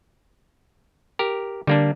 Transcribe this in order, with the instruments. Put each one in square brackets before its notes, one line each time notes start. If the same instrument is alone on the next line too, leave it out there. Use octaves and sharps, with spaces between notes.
[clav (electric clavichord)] G4 A#4
[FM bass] D3 [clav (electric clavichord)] G3 A#3 D4